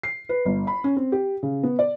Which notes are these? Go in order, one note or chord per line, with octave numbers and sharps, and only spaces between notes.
C7
B4
G1
B5
C#4
C4
G4
C#3
B3
D5